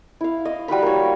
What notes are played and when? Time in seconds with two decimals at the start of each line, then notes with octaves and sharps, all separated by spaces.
0.21 E4 F5
0.45 D#5
0.68 G3 F#4 F5 B5
0.82 A#3 C#5